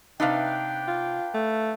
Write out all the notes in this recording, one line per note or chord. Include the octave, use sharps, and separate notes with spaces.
C3 D4 D#4 B4 F5 G5
F4
A3